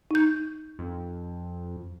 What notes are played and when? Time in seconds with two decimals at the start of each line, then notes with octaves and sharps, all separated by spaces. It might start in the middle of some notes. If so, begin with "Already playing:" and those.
0.11 D#4 G6
0.79 F2